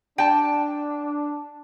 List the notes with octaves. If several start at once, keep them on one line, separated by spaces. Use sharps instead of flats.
D4 G5 A5